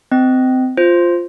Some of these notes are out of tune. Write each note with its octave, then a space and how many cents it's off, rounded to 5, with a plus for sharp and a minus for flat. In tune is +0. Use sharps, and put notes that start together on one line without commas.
C4 -25 D#5 +0
F4 +0 C5 +0